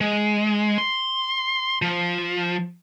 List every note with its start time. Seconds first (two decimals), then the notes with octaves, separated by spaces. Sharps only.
0.01 G#3
0.78 C6
1.82 F3